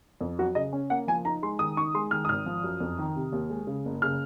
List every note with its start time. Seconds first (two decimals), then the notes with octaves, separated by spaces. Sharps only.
0.21 F2
0.39 F#3 F#4
0.55 C#3 D#5
0.73 C#4
0.90 A#3 F#5
1.08 F3 G#5
1.25 D#4 A#5
1.42 G#3 C6
1.59 D#3 D#6
1.77 D#4 C#6
1.94 G#3 C6
2.11 D#3 F6
2.25 D#6
2.29 G#1 F6
2.46 F3
2.64 F#2
2.80 F2
2.99 D#3
3.16 C3
3.32 D#2
3.50 G#3
3.67 C#3
3.86 F#1
4.02 C#3 F6